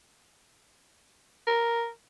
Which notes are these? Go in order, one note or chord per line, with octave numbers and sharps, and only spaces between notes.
A#4